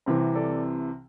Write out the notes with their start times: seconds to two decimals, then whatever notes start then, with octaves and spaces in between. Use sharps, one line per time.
0.06 C2 C3 E3 C4 E4
0.35 A4 D5